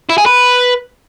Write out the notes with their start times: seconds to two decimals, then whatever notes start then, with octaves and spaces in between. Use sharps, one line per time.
0.10 E4
0.18 G#4
0.26 B4